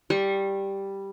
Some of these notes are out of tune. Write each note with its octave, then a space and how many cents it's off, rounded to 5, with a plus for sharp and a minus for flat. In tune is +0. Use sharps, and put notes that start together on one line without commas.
G3 +0 C#6 -40